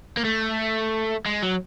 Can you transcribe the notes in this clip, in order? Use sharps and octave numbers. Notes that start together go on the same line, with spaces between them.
A#3
A3
G#3
F#3